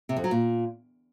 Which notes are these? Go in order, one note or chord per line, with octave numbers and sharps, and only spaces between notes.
C3
F2
F#3
A#2